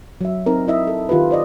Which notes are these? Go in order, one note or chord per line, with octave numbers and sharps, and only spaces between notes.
F#3 E5
C4 D#4 A#4
E4 D#5 E5
A4
D#3 F4 G4 B4
C5 D5 D#5